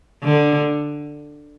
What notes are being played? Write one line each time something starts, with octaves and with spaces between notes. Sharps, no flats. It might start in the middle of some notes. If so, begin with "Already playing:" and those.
D3